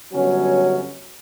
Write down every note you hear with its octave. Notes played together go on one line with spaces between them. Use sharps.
G1 F#3 C#4